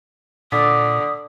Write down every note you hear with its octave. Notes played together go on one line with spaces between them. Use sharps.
A#2 D3 D5 D6 D#6 B6